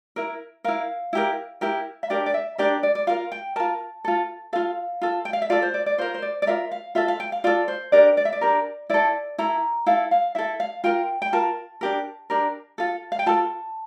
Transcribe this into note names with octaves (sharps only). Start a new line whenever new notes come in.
E4 A#4
E4 A#4 F5
E4 G4 A#4
E4 G4 A#4
E5
D4 G4 A#4 D5
D5
E5
D4 G4 A#4 D5
D5
D5
F4 A#4 F5
G5
F4 A#4 A5
F4 A4
F4 A4 F5
F4 A4
G5
F5
E5
F4 A4 D5
C5
D5
D5
F4 A#4 C5
C5
D5
D5
F4 A#4 E5
F5
F4 A4 E5
F5
G5
F5
F4 A4 D5
C5
D4 G4 A#4 D5
D5
E5
D5
D4 G4 A#4
E4 A4 D5
E4 A4 A#5
E4 A4 F5
F5
E4 A4 E5
F5
F4 A#4 G5
G5
F4 A#4 A5
D4 G4 A#4
D4 G4 A#4
F4 A4
F5
G5
F4 A4 A5